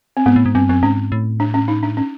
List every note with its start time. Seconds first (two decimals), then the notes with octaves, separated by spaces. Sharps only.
0.17 C4
0.26 G#2 B3
0.36 A2
0.46 G#2
0.55 G2 C4
0.69 F#2 C4
0.83 G#2 C#4
1.12 A2
1.40 D4
1.54 C#4
1.68 D#4
1.83 D4
1.97 C#4